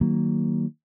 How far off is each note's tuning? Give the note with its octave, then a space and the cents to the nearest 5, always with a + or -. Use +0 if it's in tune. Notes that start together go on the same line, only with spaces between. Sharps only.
D#3 +0 F#3 +20 A#3 -5